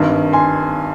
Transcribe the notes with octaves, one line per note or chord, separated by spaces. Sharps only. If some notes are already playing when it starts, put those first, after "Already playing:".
Already playing: G#1 G2 D#3
G#5 C6